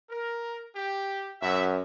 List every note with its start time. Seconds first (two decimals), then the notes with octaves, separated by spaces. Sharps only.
0.10 A#4
0.76 G4
1.42 F#2 F#4 E5